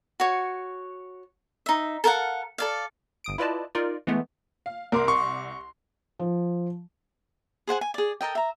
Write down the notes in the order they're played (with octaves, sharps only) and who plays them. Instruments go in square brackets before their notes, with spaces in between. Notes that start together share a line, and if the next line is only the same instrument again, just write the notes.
[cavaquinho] F#4 C#5
D#4 E5
A4 A#4 F5 F#5
A4 D5 F5
[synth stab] G1 D#6 D7
E4 F4 B4 D5 D#5 A5
D#4 F4 A#4 D5
E3 G#3 A3 B3
[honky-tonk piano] F5
[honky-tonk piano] C2 D6 [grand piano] A#4 C6
[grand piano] C6 [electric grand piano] C#6
[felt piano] F3
[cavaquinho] G#4 C5 F#5 G#5
G#5
G#4 D5
A4 A#4 D#5 G5
E5 A#5